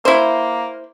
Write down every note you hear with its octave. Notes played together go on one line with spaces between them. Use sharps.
A#3 E4 C5